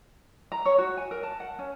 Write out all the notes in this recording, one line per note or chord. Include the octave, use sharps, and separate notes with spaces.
A#5
C#5
F#4
G#5
A#4
A5
F#5
C#4